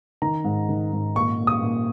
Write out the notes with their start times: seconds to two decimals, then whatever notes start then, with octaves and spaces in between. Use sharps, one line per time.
0.22 D#3 A#5
0.44 G#2
0.69 D#3
0.93 G#2
1.15 A#2 C#6
1.40 A#2
1.47 D#6
1.62 A#2